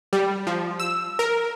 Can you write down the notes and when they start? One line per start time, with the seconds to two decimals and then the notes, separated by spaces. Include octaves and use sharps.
0.13 G3
0.47 F3
0.80 E6
1.19 A#4